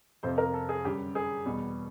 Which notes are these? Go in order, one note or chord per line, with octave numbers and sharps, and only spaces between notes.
F2 C3 F3 C5
A#4
A4
G#4
F#2 D3 G3 G4
G#4
E2 B2 G3